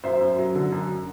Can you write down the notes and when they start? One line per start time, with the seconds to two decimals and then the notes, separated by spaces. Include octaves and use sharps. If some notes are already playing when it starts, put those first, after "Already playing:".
0.04 F#2 C5 E5
0.21 F#2
0.38 F#3
0.55 D3
0.72 F#2